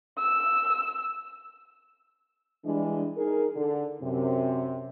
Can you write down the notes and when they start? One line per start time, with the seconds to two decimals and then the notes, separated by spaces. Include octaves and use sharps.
0.18 E6
2.65 E3 G3 G#3 D4
3.17 D#4 G#4 A#4
3.56 D3
4.02 F#2 C3